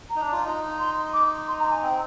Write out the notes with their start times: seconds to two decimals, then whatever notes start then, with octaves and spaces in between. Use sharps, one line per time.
0.10 A#5
0.16 D#4
0.21 D4
0.32 F4
0.44 D#4
0.79 C6
1.13 D6
1.48 C6
1.59 A#5
1.71 G#5
1.82 C4 G5